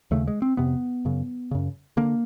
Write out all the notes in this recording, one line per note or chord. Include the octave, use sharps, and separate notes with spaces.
D#2 C#3 A3
G#3
C4
F2 C3 B3
F#2 C#3
F#2 C#3
D3 A#3